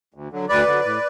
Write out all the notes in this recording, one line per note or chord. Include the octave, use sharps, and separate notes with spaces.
D2
D3 F#3
D2 B4 D5
D3 F#3
A2